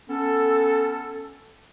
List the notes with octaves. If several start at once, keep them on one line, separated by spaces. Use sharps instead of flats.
B3 C#4 A4